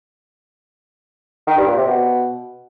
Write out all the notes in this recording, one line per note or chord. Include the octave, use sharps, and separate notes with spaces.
D#3
G2
A#2
C3
B2